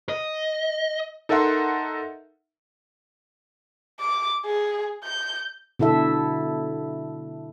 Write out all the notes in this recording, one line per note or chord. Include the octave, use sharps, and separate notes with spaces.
D#5
D#4 A4 A#4 E5 F#5 C6
D6
G#4
G6
B2 D3 E4 A4 E5